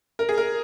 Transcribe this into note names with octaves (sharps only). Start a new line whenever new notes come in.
A#4
G#4
A#4